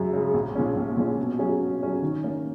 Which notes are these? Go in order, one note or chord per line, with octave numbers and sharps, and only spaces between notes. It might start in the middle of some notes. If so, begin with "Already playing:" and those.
Already playing: F#2 C#3 G#3
C#3 G#3
A#1
A#2 F3 G#3 C#4
A#1
A#2 F3 G#3 C#4
B2
F#3 C#4 G#4
B2
F#3 C#4 G#4
D#3
A#3 C#4